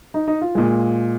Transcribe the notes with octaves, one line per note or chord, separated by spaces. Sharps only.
D#4
D#4
F4
A#2 G#3